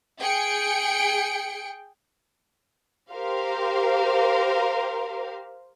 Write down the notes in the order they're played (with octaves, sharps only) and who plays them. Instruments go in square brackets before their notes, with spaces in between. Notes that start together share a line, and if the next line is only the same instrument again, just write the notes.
[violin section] G#4 G5 C#7 D7
[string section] G4 A#4 C5 F5